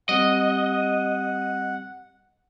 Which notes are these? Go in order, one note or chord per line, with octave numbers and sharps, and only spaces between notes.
G3 C4 G4 D#5 F#5